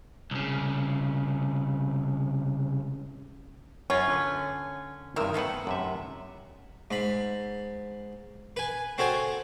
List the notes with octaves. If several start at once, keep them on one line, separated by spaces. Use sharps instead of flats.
C2 C#3
F#2 C#4 F4
D3 B4
G2 C3 D#3 A#4 E5
D#3 A3 B3 C5 F#5
F#2 C3 E5
G#2 B5
B4 G#5
C4 F#4 A4 C#5 G#5